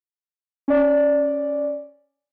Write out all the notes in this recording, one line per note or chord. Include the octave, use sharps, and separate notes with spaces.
C#4 D5